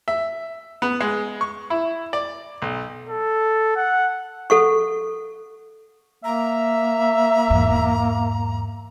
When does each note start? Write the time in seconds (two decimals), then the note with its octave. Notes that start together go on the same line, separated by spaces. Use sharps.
0.08 E5
0.82 B3
1.01 G#3
1.41 C#6
1.70 E4
2.13 D5
2.62 B1
3.09 A4
3.76 F#5
4.50 A4 F#5 C#6
6.24 A#3 E5 A#5
7.50 E2 G#2